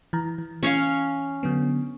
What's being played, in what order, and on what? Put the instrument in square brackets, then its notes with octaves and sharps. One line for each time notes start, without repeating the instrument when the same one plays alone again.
[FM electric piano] E3 A#5
E3
[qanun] C#4 C#5 F5
[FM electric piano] D3 F#3 B3